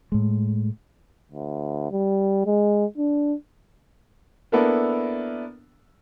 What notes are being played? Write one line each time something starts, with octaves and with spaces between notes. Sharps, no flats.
A2 G#3
D2
G3
G#3
D4
A#3 B3 D4 E4 A4 A#4